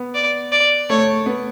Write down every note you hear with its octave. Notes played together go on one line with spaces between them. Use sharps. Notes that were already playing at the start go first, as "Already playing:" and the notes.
Already playing: B3
D5
D5
A3 C#5
B3